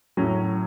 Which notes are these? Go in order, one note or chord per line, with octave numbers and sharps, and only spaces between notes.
A2 F#3 C#4